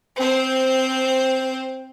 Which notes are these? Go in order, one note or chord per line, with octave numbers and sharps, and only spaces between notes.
C4 C5